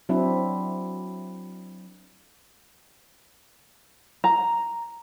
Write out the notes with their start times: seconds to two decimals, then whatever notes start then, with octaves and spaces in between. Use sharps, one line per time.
0.09 F#3 C4 D4 E4
4.24 A#5